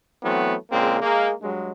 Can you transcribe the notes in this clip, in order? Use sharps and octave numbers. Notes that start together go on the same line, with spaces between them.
E3 F#3 A3 B3 C4
A#2 C#3 G#3 A#3 C4
G#3 A#3
G2 F#3 G#3